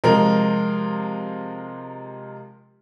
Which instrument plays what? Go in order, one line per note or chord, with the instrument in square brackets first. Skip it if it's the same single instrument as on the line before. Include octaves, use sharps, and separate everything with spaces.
[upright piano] C3 F3 G#3 A#4